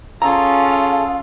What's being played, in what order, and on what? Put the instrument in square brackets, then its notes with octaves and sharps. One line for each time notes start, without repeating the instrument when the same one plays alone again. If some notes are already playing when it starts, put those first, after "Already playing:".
[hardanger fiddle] C#4 F4 [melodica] G#4 A4 [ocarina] F5 [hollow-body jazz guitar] A#5